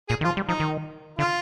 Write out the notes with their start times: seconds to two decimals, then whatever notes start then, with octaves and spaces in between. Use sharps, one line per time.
0.09 A#2 G#4
0.21 D#3
0.24 F3 F4
0.37 G3
0.49 F3 D#4
0.60 D#3
1.19 D3 F4